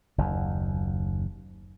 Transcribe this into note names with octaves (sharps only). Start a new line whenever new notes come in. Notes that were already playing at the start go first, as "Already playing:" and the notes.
F#1 D#2